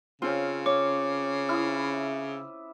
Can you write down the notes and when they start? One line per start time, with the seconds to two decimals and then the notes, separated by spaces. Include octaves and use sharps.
0.22 C#3 C4 C#4 F4
0.66 C#5 D6
1.49 E4 D#6 F6